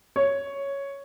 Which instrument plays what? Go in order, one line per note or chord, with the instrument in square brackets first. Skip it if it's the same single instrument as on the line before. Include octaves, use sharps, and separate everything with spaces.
[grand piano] C#5